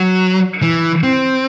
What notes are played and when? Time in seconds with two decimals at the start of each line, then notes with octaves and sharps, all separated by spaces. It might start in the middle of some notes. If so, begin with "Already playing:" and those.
Already playing: F#3
0.63 E3
1.04 C4